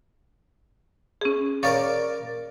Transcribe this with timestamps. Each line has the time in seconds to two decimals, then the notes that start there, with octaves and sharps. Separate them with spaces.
1.21 C#4 G#4
1.63 A#4 C#5 D5 F5 C#6